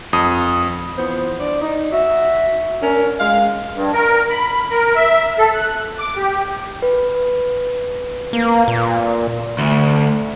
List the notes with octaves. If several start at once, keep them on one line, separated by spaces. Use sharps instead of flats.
F2 D#6
E3 F3 B3 C5
D4 D5
D#4
F#4 E5
C#4 D4 A#4
G#3 F5
G2
A#4
B5
A#4
E5
A4
F#6
D6
G4
B4
A#3
A#2
D2